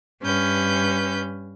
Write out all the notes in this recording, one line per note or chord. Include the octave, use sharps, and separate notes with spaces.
G2 C#4 B4 G6